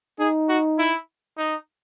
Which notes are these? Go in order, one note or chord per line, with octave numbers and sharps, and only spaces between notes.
D#4 G#4
F#4
E4
D#4